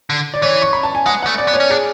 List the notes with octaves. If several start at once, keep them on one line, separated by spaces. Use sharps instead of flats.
D3
D5
E3 C#5
C#6
B5
A5
G#5
G#3 F#5
F#5
A3
D5
B3
C#5
C#4
D4 G#4